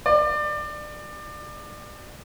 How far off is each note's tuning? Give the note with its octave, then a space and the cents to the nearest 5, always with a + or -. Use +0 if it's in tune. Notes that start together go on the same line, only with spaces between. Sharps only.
D5 +25